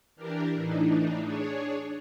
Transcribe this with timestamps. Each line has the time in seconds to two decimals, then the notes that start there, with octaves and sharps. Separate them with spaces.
0.16 E3 D4 G4 A#4
0.54 A2 E3 D4 D#4
1.24 D4 G#4 C#5